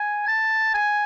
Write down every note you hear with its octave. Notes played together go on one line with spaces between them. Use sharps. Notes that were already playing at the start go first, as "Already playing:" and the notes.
Already playing: G#5
A5
G#5